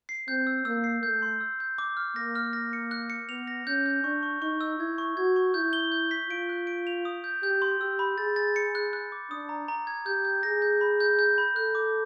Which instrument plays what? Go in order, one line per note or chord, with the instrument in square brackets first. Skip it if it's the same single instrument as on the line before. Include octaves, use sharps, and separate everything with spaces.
[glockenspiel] C7
[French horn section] C4 [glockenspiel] G6
[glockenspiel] E6
[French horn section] A#3 [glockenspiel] E6
[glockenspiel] C7
[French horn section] A3 [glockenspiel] G6
[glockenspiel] C6
E6
G6
D6
F6
[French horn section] A#3 [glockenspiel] A#6
[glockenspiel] F6
A#6
C#7
F#6
C#7
[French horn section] B3 [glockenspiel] F7
[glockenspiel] A#6
[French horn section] C#4 [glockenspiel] G6
[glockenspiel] G6
[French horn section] D4 [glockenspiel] C#6
[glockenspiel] C#6
[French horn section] D#4 [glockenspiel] C#6
[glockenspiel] E6
[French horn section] E4 [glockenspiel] G#6
[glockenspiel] C#6
[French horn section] F#4 [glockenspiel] G#6
[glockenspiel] C#6
[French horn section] E4 [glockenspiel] G6
[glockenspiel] G7
G6
B6
[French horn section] F4 [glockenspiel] D7
[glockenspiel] F#6
D7
F7
D#6
G6
[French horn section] G4 [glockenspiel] G6
[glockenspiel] C6
[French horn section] G4 [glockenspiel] E6
[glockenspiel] B5
[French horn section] G#4 [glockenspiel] A6
[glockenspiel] A6
C#7
F#6
F#6
D6
[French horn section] D4 [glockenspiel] D#6
[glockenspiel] A#5
A#5
G#6
[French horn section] G4 [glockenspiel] G6
[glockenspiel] G6
[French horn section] G#4 [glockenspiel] A#6
[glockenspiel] G6
B5
G6
G6
B5
[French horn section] A4 [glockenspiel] F#6
[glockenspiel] D6